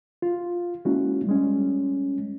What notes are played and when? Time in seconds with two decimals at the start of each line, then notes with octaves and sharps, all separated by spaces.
0.22 F4
0.85 G#3 A#3 C#4 E4 F#4
1.26 G3 G#3 C#4